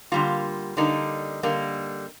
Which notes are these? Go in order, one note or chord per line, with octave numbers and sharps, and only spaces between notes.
D3 G3 A#3 F4
D3 G3 A#3 D#4
D3 G3 A#3